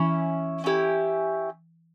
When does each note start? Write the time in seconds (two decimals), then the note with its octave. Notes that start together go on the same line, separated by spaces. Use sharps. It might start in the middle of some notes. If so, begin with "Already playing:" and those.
Already playing: E3 C#4 E4
0.64 C#4 E4 G4